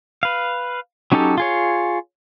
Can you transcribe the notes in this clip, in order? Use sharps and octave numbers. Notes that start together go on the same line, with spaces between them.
B4 F5
F#3 C#4 D#4 G4 A4
F4 G#4 C#5